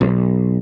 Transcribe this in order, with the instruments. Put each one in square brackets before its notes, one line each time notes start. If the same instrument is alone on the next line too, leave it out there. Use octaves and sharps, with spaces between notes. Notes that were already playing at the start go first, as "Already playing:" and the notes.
[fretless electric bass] B1